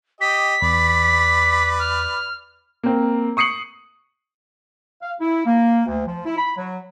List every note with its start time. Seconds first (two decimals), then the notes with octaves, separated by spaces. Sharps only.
0.21 G4 D#5 B6
0.62 E2 B4 D5
1.79 F6
2.83 A#3 C4
3.37 C#6 D#6 C7 C#7 F#7
5.01 F5
5.20 E4
5.46 A#3
5.86 D2
6.06 F3
6.25 E4
6.38 B5
6.56 F#3